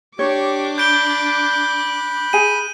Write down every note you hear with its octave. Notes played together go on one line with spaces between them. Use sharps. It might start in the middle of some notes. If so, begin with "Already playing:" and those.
D4 G4 C#5 C#6 D6
B5 F#6 G6 D7 G7
G#4 G#5 A#5 D#7